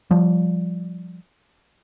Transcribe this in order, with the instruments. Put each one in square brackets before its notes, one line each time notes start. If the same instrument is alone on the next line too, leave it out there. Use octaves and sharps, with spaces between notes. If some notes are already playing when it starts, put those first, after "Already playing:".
[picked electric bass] F3 G3